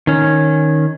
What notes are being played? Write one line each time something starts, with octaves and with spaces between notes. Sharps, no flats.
D#3 C#4